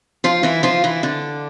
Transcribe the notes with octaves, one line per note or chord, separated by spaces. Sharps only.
F3 F4
E3 E4
F3 F4
E3 E4
D3 D4